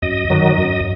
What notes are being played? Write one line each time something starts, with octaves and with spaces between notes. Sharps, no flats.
F#2 D#5
D#3 F#3
F#2